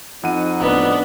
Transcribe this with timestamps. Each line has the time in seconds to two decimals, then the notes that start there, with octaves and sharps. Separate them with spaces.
0.23 F2 D#4 F#5 D#7
0.60 D1 B3 D4